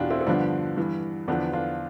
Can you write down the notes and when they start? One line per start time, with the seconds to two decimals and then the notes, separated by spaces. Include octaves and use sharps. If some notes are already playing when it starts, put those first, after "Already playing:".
Already playing: E2 B2 D4 F4 G4 B4
0.10 C4 E4
0.21 C4
0.26 G2 D3 F3 B3 D4
0.77 G2 E3
1.28 E2 D3 F3 B3 D4
1.53 D4 F4